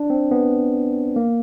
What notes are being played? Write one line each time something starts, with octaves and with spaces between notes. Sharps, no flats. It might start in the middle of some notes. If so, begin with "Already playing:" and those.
Already playing: D4
C4
B3
A#3